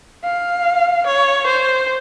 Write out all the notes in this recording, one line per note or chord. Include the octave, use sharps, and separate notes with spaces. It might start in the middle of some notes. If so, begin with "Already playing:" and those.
F5
C#5
C5